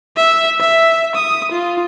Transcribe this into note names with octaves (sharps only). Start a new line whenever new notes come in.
E5
E5
D#6
F4